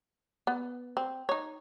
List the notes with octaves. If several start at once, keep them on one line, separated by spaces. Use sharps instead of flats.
B3
C4
D#4 C#5